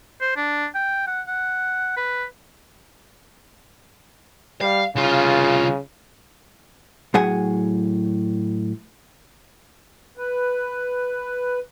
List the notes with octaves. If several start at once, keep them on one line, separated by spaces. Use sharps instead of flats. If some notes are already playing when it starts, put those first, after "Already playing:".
C5
D4
G5
F#5
F#5
B4
G3 F5
C2 C#3 F4
A2 F#3 G#4 F#5 G#5
B4